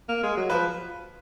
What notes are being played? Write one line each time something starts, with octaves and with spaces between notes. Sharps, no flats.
A#3
G#3
F#3
F3 B4